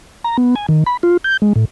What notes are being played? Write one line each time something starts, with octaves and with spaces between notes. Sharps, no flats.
A#5
B3
G#5
D#3
B5
F4
G6
G#3
A2